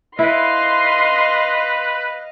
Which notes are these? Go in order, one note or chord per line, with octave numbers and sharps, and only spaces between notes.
E4 B4 D#5 F5 C6